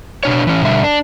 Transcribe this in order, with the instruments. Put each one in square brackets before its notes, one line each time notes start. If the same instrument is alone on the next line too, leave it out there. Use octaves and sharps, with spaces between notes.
[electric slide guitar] B2 D4 C#5
E3 C#4
B2 D3 G3 E5
D4